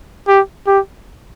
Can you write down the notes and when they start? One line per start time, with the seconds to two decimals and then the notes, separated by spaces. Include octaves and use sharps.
0.28 G4
0.67 G4